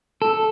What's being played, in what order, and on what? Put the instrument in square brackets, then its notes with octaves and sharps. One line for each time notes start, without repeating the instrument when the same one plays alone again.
[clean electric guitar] A4